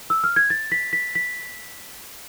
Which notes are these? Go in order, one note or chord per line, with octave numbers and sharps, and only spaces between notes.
E6
F6
G#6
A6
B6
B6
B6